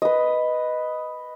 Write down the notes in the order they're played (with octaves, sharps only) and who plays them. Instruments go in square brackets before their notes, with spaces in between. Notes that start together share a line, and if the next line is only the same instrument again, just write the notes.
[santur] B4 D#5